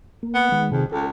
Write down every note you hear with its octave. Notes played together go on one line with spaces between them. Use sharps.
A#3
B3
D#3 G#3
F2 C3 D#3 G#4
C#2 A4